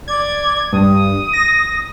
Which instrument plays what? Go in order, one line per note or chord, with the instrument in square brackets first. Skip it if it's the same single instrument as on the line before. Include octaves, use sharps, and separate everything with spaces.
[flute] D5 [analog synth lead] G#6
[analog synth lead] G2 [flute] D#6
[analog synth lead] A#6